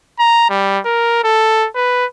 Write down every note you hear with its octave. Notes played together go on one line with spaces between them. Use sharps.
A#5
G3
A#4
A4
B4